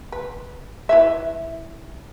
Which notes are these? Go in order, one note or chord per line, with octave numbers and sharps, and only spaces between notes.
B4
E4 B4 E5